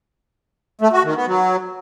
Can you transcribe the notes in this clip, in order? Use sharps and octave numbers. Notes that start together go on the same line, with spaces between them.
A3
F#4
D#3
B3
F#3